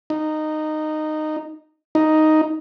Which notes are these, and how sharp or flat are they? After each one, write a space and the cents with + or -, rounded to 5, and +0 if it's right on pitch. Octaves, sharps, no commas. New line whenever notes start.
D#4 -15
D#4 +0